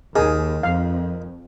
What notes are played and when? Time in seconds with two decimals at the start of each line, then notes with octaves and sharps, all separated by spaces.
0.16 D#2 D#3 G#4
0.63 F2 F5